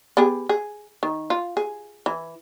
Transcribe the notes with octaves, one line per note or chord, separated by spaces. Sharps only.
B3 G4 G#4
G#4
D#3
F4
G#4
E3